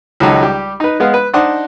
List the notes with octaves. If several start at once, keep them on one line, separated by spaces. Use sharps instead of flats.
C#2 D#3 F#3 G#3 D#4 A4
G3 G4
D#4 B4
G#3 B3 B4 F5
B4
D4 D#4 C5 D#5 F#5